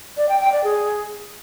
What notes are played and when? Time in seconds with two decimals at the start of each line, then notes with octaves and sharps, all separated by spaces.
0.17 D5
0.29 G5
0.41 G5
0.52 D5
0.64 G#4